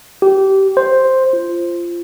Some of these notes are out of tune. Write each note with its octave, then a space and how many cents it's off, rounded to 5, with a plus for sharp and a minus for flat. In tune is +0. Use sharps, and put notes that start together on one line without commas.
G4 -20
C5 +5
F4 -20